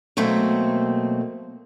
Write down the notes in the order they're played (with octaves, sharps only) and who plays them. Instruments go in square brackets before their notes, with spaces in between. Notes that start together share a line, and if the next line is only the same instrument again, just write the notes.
[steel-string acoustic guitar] B2 F#3 A3 A#3 C4